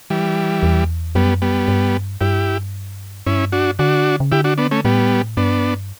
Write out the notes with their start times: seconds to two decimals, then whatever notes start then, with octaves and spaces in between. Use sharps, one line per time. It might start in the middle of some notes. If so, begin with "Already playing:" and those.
0.10 E3 G3
0.63 E2
1.15 F#2 G3 B3
1.42 G3 B3
1.68 G2
2.21 G2 E4 G4
3.26 G2 C#4 E4
3.52 D4 F#4
3.79 D3 D4 F#4
4.20 C#3
4.32 D3 E4 G4
4.44 D4 F#4
4.58 B3 D4
4.71 A3 C#4
4.85 A2 G3 B3
5.37 G2 B3 D4